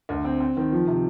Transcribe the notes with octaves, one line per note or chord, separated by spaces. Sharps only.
D2
C4
C4
D#3
F3
C3